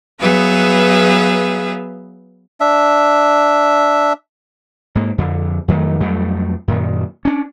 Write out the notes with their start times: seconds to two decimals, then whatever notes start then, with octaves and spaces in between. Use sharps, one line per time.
0.20 F#3 B3 G#4 B4 E5 F5
2.61 D4 E5
4.95 G#2 A#3
5.18 F2 D3
5.68 F2 D#3 F#3 A3
6.00 F2 F#3 G3 A3
6.68 F#2 A#2 D#3
7.25 C#4 D4